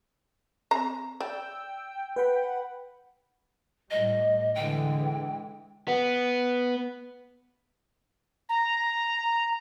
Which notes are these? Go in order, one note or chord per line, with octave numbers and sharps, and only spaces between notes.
C4 A#5
D5 G5 E6
B4 F#5 B5
A2 G3 D#5
D3 E3 G#3 G5
B3
A#5